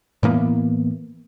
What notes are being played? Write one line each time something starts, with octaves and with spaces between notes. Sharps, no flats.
A2 E3 A#3 B3